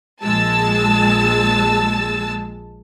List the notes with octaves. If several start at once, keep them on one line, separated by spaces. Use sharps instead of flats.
A#1 G#3 A5 E6 A6